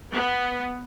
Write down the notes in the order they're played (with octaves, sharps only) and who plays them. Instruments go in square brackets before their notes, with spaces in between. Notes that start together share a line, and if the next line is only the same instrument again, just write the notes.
[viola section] B3